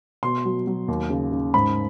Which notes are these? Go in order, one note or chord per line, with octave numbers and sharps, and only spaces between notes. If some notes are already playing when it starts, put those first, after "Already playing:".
B2 C6
F#3
F#3
D#2
C#3
C#3
G#2 B5